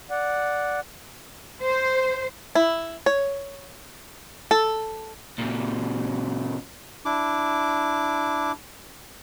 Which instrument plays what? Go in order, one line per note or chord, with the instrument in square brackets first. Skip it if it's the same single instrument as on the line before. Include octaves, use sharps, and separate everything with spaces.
[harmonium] D5 F#5
[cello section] C5
[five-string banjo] E4
C#5
A4
[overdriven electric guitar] A#2 C#3
[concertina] D4 E4 D6